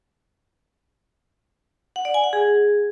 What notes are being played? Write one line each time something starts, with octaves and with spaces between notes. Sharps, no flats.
F#5
D5
G#5
F#5
G#4